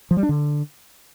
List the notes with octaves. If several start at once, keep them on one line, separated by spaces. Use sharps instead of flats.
F3
G3
D4
D3